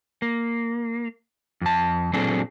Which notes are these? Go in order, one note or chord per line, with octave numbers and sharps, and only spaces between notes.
A#3
F2 A5
A#2 F#3 C4 D4 G#4 A4